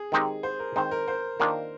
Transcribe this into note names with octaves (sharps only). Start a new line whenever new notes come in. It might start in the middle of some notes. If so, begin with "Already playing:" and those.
Already playing: G#4
D#3 G#3 C4 D#4 G4
C5
A#4
D#3 G#3 C4 D#4 C5
A#4
C5
D#3 A#3 D4 F4